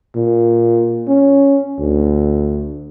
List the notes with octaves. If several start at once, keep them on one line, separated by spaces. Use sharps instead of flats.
A#2
C#4
D2